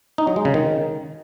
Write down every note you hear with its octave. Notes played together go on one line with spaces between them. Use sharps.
D#4
F#3
G#3
C#3
D#3